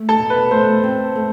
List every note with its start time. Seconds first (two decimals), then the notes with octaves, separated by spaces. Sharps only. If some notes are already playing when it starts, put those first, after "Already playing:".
Already playing: A3
0.09 A4 A5
0.19 B2
0.30 B4
0.51 A3 C5
0.83 C4
1.16 A3